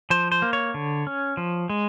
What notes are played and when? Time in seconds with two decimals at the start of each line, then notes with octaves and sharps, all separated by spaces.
0.10 F3 C5
0.32 C5
0.42 A#3
0.53 C#5
0.74 D3
1.07 C#4
1.37 F3
1.69 G#3